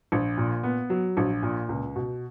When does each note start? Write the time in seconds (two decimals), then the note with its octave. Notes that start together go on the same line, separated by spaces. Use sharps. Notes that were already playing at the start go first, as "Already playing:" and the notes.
0.12 A#1
0.37 A#2
0.63 B3
0.90 F#3
1.17 A#1
1.43 A#2
1.69 C#2
1.95 B2